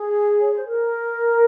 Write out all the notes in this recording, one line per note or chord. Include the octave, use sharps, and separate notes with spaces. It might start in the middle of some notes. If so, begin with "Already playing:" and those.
Already playing: G#4
C#5
C5
A#4